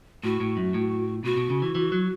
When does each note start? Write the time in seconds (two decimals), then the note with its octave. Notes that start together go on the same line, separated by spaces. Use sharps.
0.24 A2 F#4
0.40 A2
0.57 F#2
0.74 A2
1.24 B2 F#4
1.37 B2
1.50 C#3
1.62 E3
1.75 E3
1.92 F#3